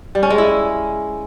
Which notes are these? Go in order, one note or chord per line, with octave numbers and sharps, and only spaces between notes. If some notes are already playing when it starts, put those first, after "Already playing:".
G3
C#4
G#3
E4